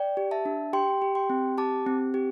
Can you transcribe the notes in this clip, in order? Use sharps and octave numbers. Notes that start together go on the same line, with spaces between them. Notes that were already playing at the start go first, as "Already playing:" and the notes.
Already playing: D5 G5
G4
E5 A5
D4
G4 G5 C6
G4
G5 C6
C4
G4 A5 D6
C4
G4